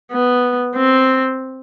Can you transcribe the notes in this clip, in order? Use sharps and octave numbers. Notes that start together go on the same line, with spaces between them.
B3
C4